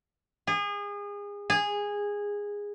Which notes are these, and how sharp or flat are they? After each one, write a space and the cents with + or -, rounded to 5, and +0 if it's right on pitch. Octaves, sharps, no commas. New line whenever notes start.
G#4 -30
G#4 -15